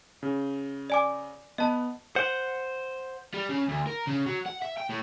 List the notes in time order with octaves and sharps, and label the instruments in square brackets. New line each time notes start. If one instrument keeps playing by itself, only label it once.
[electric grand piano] C#3
[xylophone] D5 G#5 D6
[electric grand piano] B3 B4 [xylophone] D#5 A5
[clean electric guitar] C5 F#5
[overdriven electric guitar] G3
C#3
D2
A#4
C#3
F#3
F#5
E5
G5
A2